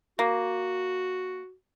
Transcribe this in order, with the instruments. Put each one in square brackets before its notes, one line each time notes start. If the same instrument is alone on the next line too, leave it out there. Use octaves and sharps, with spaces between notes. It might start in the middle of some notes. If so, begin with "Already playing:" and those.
[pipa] A#3 [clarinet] F#4